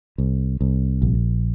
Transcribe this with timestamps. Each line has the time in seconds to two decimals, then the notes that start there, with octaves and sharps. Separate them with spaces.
0.18 C2
0.61 C2
1.02 A#1